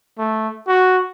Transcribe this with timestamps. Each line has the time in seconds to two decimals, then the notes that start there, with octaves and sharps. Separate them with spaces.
0.19 A3
0.68 F#4